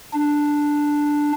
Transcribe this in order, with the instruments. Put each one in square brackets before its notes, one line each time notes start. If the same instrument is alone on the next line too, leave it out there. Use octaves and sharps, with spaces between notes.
[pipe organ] D4